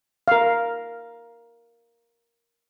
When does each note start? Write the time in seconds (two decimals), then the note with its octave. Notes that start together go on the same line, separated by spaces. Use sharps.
0.28 A#4 F5